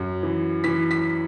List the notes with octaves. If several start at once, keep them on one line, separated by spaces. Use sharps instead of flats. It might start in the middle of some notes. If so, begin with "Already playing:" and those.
Already playing: F#2
E3
E3 B6
B6